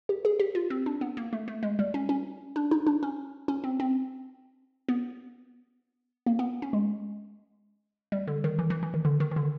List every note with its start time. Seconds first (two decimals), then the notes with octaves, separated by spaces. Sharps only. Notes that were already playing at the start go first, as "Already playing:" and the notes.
0.09 G4
0.25 G#4
0.40 G4
0.55 F4
0.70 C4
0.86 D4
1.01 B3
1.17 A#3
1.33 A3
1.48 A3
1.63 G#3
1.79 G3
1.94 C#4
2.09 C#4
2.56 D4
2.71 D#4
2.87 D4
3.03 C#4
3.48 C#4
3.64 C4
3.80 C4
4.89 B3
6.26 A#3
6.39 B3
6.62 C#4
6.73 G#3
8.12 G3
8.27 D3
8.44 D#3
8.59 E3
8.70 E3
8.83 E3
8.94 D#3
9.05 D3
9.20 D#3
9.31 D#3
9.36 D3